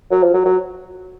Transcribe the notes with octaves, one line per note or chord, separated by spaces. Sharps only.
F#3
F3
F#3
F#3